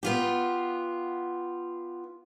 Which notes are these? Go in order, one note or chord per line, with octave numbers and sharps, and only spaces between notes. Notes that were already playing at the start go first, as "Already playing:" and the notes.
B3 F4 G4